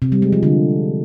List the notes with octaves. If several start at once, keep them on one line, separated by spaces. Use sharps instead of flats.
C3
G3
G#3
F3
D3